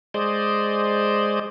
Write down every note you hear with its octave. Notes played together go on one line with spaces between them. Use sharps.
G#3 C5 D5 D#5